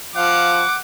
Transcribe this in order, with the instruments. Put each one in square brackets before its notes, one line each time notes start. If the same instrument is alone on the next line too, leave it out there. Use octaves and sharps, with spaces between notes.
[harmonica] F3 F5 [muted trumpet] F#5 [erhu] D6